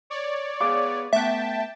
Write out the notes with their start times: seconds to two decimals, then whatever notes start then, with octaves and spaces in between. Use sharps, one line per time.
0.10 C#5 D5
0.61 B3 G#4 F5 D6
1.13 A3 B3 E5 G5 A5